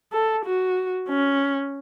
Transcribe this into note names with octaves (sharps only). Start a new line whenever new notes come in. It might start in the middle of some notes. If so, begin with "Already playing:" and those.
A4
F#4
C#4